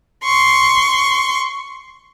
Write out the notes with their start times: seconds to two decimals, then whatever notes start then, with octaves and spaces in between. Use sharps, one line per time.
0.24 C6 C#6